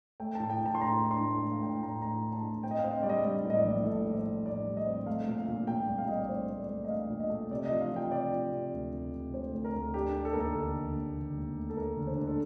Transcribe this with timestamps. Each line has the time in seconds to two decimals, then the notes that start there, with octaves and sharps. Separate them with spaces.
0.20 A3 G5
0.35 A2 A5
0.50 G5
0.61 A2 A5
0.75 C6
0.81 A2 A#5
1.02 D4
1.11 C6
1.21 A2
1.41 A3
1.52 F5
1.61 A2 G5
1.82 A2 A#5
2.02 A2 A#5
2.23 D4
2.33 A5
2.43 A2
2.63 C4 G5
2.71 D#5
2.79 F5
2.84 C4
2.93 D#5
3.03 G3 D5
3.09 D#5
3.24 G3 D#5
3.44 A2
3.50 D#5
3.55 D5
3.64 A#1
3.85 A2 A4
4.06 A2 D5
4.16 C5
4.25 A2
4.46 A2 D5
4.67 G3
4.77 D#5
4.86 C4
5.06 A3 F5
5.28 A#2
5.38 F5
5.48 A#2
5.67 A#2 G5
5.88 C2
5.98 F5
6.08 C2 D#5
6.19 D5
6.29 A3 C5
6.49 A3
6.60 D5
6.69 A3
6.84 D#5
6.89 A3 F5
7.10 A#2
7.20 D#5
7.30 A3
7.51 C3 D5
7.66 D#5
7.71 F3
7.81 F5
7.91 F3 G5
8.12 C3 D5
8.32 F3
8.52 C3
8.72 D2
8.93 C3
9.13 C3
9.33 A3 C5
9.53 D2
9.64 A#4
9.73 D2
9.94 D4 G4
10.15 D4
10.25 A4
10.33 D#2 A#4
10.41 A4
10.55 D3
10.76 D3
10.96 D#2
11.17 D3
11.37 D#2
11.57 A3
11.70 A4
11.77 A3 A#4
11.97 D3
12.07 C5
12.18 D4
12.27 A4